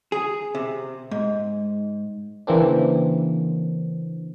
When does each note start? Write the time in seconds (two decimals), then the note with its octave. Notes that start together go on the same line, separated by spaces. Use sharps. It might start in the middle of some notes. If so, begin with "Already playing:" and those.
0.12 G#4
0.55 C3
1.11 G#2
2.47 C#3 E3 A#3 C4 D4